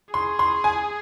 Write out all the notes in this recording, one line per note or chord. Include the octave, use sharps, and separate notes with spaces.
G#4 C6
C6
G#5